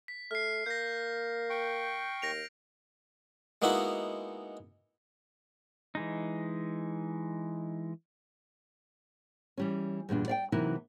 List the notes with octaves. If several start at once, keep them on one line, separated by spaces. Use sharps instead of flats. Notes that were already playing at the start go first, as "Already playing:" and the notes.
B6
A3 F6 C7
A#3 G6 A#6
G5 C#6
D#2 A#6 D7 F7
G#3 A#3 B3 D#4 E4 F#4
E3 G#3 D#4
E3 G3 C#4
E2 G2 A#2 D4
D5 F5 G5
C3 E3 F#3 A#3 D#4 E4